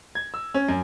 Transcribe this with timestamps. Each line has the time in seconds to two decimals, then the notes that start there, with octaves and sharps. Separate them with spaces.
0.15 G#6
0.34 E6
0.54 C#4
0.69 F#2